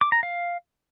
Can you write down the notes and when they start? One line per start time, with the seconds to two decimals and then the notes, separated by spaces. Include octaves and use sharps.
0.01 D6
0.12 A#5
0.23 F5